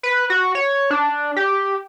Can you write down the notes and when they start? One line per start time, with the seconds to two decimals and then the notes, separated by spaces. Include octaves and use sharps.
0.03 B4
0.30 F#4
0.55 C#5
0.91 D4
1.36 G4